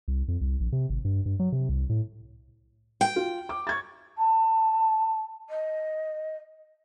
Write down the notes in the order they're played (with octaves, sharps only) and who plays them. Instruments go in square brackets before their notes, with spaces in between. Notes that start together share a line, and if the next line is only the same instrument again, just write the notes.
[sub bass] C2
F2
C2
A#1
C3
G#1
G2
G2
F#3
C3
C2
A2
[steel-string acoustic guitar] G5
[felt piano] F4
D6
C#6 G#6 A6
[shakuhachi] A5
D#5